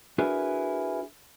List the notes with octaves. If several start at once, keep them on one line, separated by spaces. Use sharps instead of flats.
D4 E4 F#4 G#4 A#4 B4